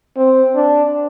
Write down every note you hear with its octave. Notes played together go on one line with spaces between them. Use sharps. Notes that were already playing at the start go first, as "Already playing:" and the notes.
C4
D4